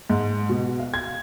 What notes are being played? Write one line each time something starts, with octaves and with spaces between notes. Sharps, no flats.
G#2
B2
F5
G#6